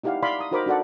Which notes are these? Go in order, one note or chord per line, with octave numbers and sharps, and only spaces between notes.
D#4 E4 G4 D5 F5 F#5
D5 E5 F5 B5 C6 D6
A#5 D#6
D#4 F#4 A#4 C5 B5 D6
D4 F#4 A4 D5 F#5